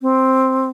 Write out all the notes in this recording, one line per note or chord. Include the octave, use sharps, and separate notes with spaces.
C4